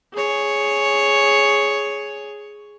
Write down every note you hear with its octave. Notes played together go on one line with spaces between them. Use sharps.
G#4 C#5